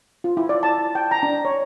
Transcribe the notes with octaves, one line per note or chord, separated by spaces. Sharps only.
F4
E4
D5
A5
G5
A#5
D4
C#5